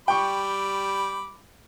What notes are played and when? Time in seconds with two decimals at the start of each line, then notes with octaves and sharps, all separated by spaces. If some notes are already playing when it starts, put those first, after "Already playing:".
0.08 G3 G5 B5 C#6 D6